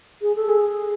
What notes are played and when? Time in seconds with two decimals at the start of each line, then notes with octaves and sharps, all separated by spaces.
0.22 G#4
0.36 A4
0.49 G#4